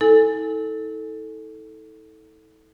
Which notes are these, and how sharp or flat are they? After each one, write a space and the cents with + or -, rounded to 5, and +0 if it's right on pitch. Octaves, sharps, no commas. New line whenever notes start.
E4 -45 A4 +0 G#5 +0